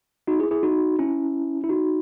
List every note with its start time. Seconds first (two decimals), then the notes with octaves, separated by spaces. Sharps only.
0.27 D#4 F#4
0.39 E4 G#4
0.51 E4 G#4
0.63 D#4 F#4
0.99 C#4 E4
1.64 E4
1.69 D#4 F#4